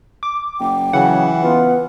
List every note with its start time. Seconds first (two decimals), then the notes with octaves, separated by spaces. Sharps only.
0.23 D6
0.60 F#1 G5
0.93 C#3 E3 F#3 F#5
1.42 B3 F4 B4